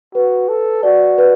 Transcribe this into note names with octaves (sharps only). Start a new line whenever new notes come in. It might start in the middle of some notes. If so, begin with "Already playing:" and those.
F#4 B4
A4
F#4 D5
B4